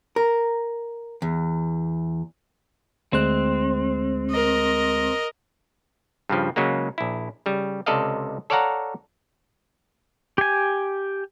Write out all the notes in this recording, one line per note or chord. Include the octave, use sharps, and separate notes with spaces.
A#4
E2
D2 G#3 C4 F#6
A#4 D#5
G2 C#3 F3
C#3 F#3 G#3 A#3
A#1 E4
C#3 G3
C#2 C3 A4 D5 D#5 F5
A4 C#5 D5 F5 F#5 A#5
G4 G#5